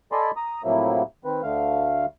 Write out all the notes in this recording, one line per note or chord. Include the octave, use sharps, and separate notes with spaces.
A4 D5 D#5 G#5 B5 C6
A#5 D#6
A2 C3 F3 F#3 A#3 E4
D#3 C4 B4
D2 D3 A3 F5